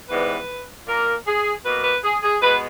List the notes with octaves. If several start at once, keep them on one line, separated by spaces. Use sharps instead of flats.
G#2 E3 G3 B3 B4
A#2 A#3 A#4
G#4
B2 A#3 B4
B4
G#4
G#4
B2 G#3 B3 B4